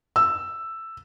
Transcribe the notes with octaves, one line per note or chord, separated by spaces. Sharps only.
E6